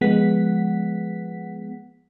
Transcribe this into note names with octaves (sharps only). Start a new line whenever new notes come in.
F3 G#3 B3 F#5 B6